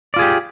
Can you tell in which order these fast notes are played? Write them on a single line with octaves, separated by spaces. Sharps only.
D5 F4 G#4 G4